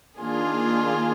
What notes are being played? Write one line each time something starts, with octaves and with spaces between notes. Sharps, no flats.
D#3 A#3 D4 F4 G#4